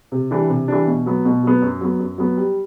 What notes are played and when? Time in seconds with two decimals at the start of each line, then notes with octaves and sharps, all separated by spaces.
0.12 C3
0.31 E3 G3 D4
0.49 C3
0.68 E3 G3 D4
0.87 B2
1.06 F#3 B3
1.25 B2
1.43 F#3 B3
1.62 F#2
1.81 F#3 B3
1.99 F#2
2.18 F#3 B3
2.37 G3